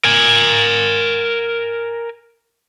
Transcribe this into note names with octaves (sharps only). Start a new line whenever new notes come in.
A#4 G#5